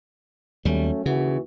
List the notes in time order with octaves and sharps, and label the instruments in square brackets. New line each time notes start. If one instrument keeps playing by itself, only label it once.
[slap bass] D#2 G3 [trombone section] F#3 A3 C#4
[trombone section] D#2 E3 F#4 [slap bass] C#3